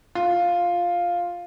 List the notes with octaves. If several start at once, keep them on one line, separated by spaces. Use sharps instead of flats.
F4